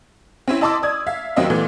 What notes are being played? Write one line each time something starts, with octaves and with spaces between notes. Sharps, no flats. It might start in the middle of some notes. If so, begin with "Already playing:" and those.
C4 C#4 E4
E4 D#5 A5 C6 D6 E6
D5 D#6 G#6
E5 F5
D#2 F#3 A#3 C4 D#5 E5
A#2 E3 A3 B3